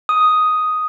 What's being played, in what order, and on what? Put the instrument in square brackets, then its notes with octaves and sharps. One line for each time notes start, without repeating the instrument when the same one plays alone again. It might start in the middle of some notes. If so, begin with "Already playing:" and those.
[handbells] D#6